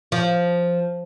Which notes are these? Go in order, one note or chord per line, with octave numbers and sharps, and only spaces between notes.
F3